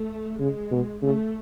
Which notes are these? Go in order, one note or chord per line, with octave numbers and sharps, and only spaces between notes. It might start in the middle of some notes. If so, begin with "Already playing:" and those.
Already playing: A3
C#3 G#3
B2
C#3 A3